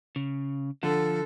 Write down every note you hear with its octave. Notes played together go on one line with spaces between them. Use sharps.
C#3
D3 F3 A4